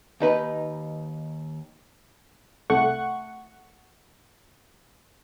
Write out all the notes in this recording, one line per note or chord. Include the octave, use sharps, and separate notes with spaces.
D#2 D#4 B4
C2 A3 F#5 C#6